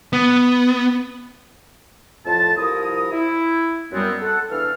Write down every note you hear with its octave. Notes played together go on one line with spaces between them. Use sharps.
B3
F2 A2 F3 F4 A5
C2 F3 E4 A#4 D#6
E4
F#2 G3 B3 C4
A4 F#5
E2 E3 D4 A4 F5 F6